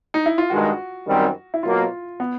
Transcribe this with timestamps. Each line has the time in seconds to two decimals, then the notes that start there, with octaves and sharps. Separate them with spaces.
0.14 D#4
0.26 E4
0.38 F4
0.50 G2 D#3 G#3 F#4
1.06 F#2 D#3 G3 C4
1.54 E4
1.63 B2 F#3 A#3 F4
2.20 B3